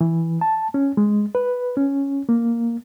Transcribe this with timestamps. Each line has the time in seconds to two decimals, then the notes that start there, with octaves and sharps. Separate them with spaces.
0.01 E3
0.41 A5
0.74 C#4
0.97 G#3
1.35 B4
1.77 C#4
2.29 A#3